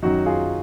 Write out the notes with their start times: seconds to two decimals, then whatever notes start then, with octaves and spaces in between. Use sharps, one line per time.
0.02 F#2 D#3 F#3 D#4 F#4
0.26 F4 G#4